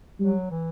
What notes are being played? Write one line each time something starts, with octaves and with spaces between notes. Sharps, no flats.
F#3 G3
E3